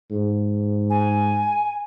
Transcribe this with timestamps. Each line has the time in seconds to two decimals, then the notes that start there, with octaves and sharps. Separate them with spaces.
0.11 G#2
0.90 G#5